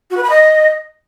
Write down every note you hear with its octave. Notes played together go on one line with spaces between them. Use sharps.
F#4
B4
B5
D#5